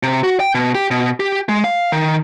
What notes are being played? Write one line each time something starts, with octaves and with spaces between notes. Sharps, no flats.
C3
F#4
G5
B2
G4
B2
G4
G#3
F5
D#3